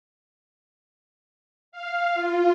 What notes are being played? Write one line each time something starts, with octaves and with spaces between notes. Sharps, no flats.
F5
F4